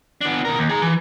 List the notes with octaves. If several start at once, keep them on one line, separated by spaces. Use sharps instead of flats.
B3 D4
B2 A#4
D#2
G#4 A#5
E3